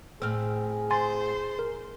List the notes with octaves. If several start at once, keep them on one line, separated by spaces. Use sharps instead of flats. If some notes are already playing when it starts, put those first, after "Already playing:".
A2 C4 G#4 E6 F6
C5 G#5 C6 A6
A#4